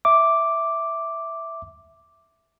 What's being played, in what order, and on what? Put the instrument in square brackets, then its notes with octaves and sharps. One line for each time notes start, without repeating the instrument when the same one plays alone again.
[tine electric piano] E5 D6